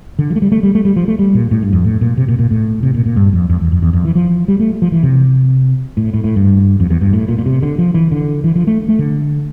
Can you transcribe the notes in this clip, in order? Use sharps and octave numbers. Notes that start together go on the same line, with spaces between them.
D3
F3
A3
G3
A3
G3
A3
G3
F3
A3
G3
A#2
A2
G2
F2
A2
A#2
C3
A#2
A#2
A2
C3
A#2
A#2
G2
F2
F2
E2
F2
E2
F2
E3
F3
G3
A3
F3
E3
C3
A2
A2
A2
G2
F2
E2
G2
A2
A#2
A#2
C3
D3
F3
E3
D3
E3
F3
A3
A3
D3